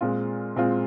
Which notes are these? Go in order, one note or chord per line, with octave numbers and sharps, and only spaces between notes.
A#2 G#3 C4 F4
A#2 G#3 C4 F4